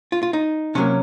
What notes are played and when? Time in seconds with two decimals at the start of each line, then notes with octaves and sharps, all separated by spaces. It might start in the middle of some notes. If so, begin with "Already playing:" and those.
0.12 F4
0.23 F4
0.33 D#4
0.75 C3 F#3 A#3 C#4